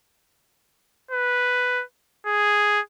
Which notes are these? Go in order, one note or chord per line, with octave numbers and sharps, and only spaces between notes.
B4
G#4